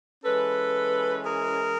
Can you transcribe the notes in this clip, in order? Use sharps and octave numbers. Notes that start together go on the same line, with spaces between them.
E3 G#3 C#4 A4 B4
G#4 A#4